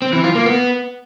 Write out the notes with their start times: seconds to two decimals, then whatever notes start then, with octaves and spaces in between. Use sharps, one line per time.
0.02 C4
0.13 E3
0.24 F4
0.35 A#3
0.46 B3